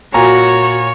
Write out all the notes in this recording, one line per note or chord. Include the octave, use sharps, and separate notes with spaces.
A#2 F#4 C#5 A#5